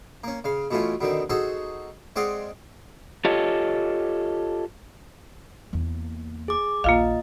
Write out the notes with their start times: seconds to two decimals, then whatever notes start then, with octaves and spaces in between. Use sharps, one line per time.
0.24 A#3 C#4
0.44 C#3 F5
0.71 B2 E3 A3 C#4 F4
1.01 B2 D3 D#3 C4
1.30 D#4 F#4 G#4 A4 C5
2.16 G#3 C4 D5 D#5 F5 F#5
3.25 F4 G4 A4 C#5 D#5
5.73 E2 A#3
6.48 G#4 D6
6.84 A#1 D#2 A#3 F4 D#5 F5